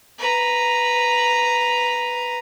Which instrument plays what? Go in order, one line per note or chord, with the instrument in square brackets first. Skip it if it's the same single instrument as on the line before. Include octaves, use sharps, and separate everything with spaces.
[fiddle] B4 A#5